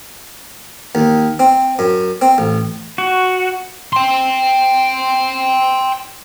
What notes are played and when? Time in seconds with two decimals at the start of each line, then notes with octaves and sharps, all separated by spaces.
0.95 D#2
1.39 C4
1.79 F#2
2.22 C4
2.38 A1
2.98 F#4
3.93 G5 C6